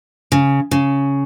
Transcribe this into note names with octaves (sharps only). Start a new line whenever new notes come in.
C#3
C#3